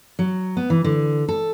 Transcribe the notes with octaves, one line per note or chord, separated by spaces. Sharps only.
F#3
B3
E3
D3
A4